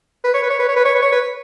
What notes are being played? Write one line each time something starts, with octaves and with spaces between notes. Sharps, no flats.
B4
C#5
B4
C#5
B4
C#5
B4
C#5
B4
C#5
B4